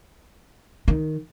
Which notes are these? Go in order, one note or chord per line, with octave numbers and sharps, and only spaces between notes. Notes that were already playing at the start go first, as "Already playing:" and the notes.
D#3